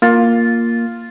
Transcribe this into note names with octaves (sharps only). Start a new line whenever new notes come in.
A#3 F4